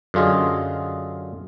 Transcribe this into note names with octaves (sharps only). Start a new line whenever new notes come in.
F#2 D3 F4 G#4 D#5